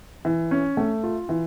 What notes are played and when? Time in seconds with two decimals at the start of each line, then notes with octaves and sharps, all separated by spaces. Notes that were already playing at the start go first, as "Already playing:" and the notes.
0.25 E3
0.51 C#4
0.77 A3
1.03 F4
1.29 E3